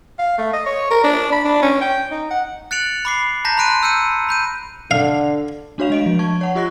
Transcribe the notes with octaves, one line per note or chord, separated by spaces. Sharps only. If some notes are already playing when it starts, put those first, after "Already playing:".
F5
A3
D#5
C#5
A#4
D4
B5
D4
C#4
G5
D#4
F#5
F#6 A6 C#7 D7 F7 F#7
B5 D6 C7
A5 A#5 G6 A#6 B6
B5 C6 F#6 D7 D#7
E6 G6 C#7 D#7
B5 G6 D#7
D3 F5
A3 D4 F#4 C#5 F5 F7
G#3 D#5 D7
F3
A5 C#6 G#6
C#5 F#5 C#6
F4 G4 D#5 C#6 F#6 A#6